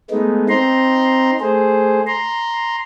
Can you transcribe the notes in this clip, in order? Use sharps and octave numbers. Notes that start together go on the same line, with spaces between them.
G#3 A3 B3 D#4
C4 D#4 A#5 C6
A3 G#4 C5
A#5 C6